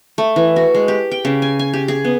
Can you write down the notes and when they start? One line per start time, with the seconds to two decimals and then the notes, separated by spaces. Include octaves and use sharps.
0.18 A3
0.36 E3
0.56 F#4
0.74 G#3
0.88 G4
1.11 G5
1.25 C#3
1.42 G#5
1.59 G#5
1.73 G4
1.88 G#4
2.04 B3